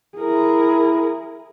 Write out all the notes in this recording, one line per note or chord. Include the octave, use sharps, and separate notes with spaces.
E4 G#4 A#4